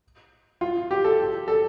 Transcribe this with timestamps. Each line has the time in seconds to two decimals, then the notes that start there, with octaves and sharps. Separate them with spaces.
0.61 F4
0.91 G4
1.04 A4
1.48 A4